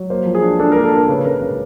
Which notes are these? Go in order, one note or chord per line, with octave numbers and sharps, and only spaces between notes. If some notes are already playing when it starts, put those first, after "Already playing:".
Already playing: F#3
A#3 C5
F3
G#4
D4
D4 A4
A#3 A#4
A4
D4 A#4
C#3 B4
C#3 A#4
C#3 A#4